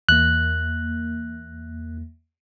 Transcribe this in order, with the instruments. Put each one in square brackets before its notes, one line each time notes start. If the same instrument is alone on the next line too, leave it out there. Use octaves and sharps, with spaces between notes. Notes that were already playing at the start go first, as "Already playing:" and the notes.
[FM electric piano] E2 A#3 [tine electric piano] F#6